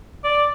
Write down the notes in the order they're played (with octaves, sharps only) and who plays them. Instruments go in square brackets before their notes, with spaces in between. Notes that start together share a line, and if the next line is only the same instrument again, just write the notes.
[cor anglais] D5